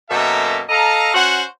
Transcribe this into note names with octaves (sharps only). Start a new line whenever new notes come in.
F#2 B2 A#3 A4 E5 A#5
A4 D#5 F5 A#5
C#4 F#4 C5 F#5